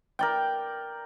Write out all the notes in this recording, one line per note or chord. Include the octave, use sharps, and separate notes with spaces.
A#4 D5 G5